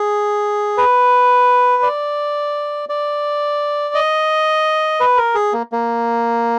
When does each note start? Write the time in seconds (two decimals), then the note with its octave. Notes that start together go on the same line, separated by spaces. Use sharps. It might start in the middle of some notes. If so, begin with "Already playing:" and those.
Already playing: G#4
0.77 B4
1.83 D5
2.89 D5
3.94 D#5
5.00 B4
5.17 A#4
5.35 G#4
5.53 A#3
5.72 A#3